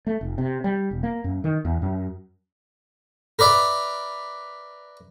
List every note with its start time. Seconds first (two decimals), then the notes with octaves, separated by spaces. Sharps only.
0.07 A3
0.21 F1
0.38 C3
0.64 G3
0.91 E1
1.03 A#3
1.24 F#2
1.44 D#3
1.65 E2
1.82 F#2
3.39 A#4 B4 D5 E5